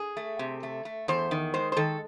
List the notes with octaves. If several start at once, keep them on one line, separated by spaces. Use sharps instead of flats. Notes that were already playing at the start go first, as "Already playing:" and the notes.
Already playing: G#4
A3
C3
A3
A3
E2 C5
D#3
G#3 C5
C5
D#3 A4